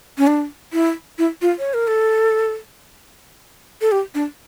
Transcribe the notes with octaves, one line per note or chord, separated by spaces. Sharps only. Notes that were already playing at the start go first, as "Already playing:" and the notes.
C#4
D4
E4
E4
F4
C#5
A#4
A4
A4
G4
D4